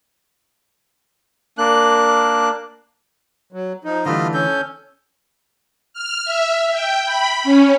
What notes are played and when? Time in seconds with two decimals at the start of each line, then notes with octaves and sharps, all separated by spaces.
1.58 A#3 D4 F#6
3.52 F#3
3.85 F3 D#4
4.05 D3 E3 G3 A3 F4 D#5
4.34 C#4 A4 G6
5.93 F6
6.25 E5
6.71 G5
7.05 B5
7.44 C#4